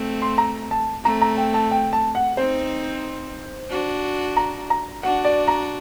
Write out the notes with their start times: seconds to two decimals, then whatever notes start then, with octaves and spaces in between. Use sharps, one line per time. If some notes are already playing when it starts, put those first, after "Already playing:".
Already playing: A3 C4
0.22 C6
0.38 A#5
0.71 A5
1.04 A3 C4 A#5
1.22 A#5
1.37 G5
1.54 A5
1.71 G5
1.93 A5
2.15 F#5
2.37 C4 D#4 C5
3.70 D4 F#4
4.37 A#5
4.70 A#5
5.02 D4 F#4 F#5
5.25 D5
5.48 A#5